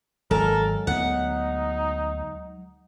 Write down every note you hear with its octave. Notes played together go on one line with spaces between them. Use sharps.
G#1 F#3 G#3 A4 A#4
D2 B3 D#4 F#5